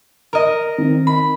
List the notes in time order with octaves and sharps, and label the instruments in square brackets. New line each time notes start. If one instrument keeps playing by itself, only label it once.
[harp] A#4 D#5
[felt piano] D#3 C4
[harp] B5